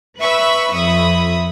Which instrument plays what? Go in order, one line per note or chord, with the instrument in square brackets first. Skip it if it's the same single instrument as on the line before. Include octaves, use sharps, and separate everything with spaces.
[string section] B4 E5 B5 C#6 E6
F2 E5 B5 D#6